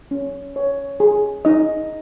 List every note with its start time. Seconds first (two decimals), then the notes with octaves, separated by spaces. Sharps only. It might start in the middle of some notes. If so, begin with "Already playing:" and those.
0.11 C#4
0.56 C#5
1.00 G#4
1.45 D#4 D#5